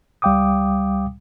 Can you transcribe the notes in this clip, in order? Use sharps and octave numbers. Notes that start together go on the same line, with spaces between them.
C#2 G3 F5 G5 D6 D#6